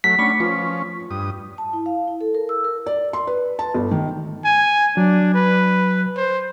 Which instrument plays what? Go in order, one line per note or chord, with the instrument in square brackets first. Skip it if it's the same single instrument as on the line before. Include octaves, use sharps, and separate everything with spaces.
[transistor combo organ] F#3 A3 [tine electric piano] B6
[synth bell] A3 B5 C#7 [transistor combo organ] C#4 D4
[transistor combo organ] F3 C#4 [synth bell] F4
[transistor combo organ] G2 D#6
[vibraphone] A5
E4
F5
E4
A4
A#4
E6
A#4
[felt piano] D5
C6
B4
A5
G1
D#3
[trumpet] G#5
[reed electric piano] F#3 [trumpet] D4
[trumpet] B4
C5